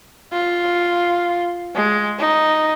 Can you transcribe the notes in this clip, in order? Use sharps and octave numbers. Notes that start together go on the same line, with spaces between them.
F4
G#3
D#4